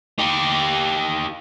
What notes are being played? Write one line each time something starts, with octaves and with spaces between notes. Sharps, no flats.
D#4 G4